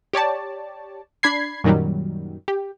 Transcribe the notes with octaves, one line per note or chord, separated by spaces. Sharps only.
G4 C#5 D5 A5
D4 B5 G#6 C7
F#2 A#2 D#3 F#3 G3
G4